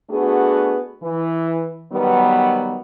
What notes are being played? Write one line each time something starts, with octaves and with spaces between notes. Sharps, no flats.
A3 B3 D4 F#4 G#4
E3
D#3 F#3 G3 B3